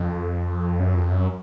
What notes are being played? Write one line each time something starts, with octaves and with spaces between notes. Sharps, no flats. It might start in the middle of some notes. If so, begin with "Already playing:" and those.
Already playing: F2
F#2
F2
F#2